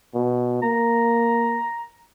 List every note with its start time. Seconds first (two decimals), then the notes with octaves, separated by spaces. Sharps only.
0.15 B2
0.62 A#3 A#5